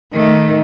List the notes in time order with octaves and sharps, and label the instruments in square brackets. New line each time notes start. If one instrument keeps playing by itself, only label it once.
[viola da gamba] D#3 [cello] A3